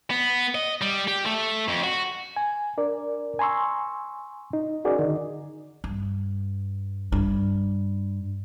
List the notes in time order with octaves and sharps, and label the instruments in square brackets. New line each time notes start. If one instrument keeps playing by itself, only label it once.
[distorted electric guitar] B3
D#5
G3
G4
A3
F2
F#4
[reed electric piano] G#5
D4 A#4 D5
G#5 A#5 C6 C#6 E6
D#4
C#4 D#4 F#4 G#4 A#4 D5
D3 D#3 D#4
[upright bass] G2
G2